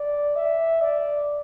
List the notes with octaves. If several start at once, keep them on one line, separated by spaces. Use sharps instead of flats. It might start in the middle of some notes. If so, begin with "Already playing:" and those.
Already playing: D5
E5
D5